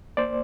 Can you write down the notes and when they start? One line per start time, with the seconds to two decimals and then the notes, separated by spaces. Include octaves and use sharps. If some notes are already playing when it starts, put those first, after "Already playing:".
0.17 A#3 C5 D5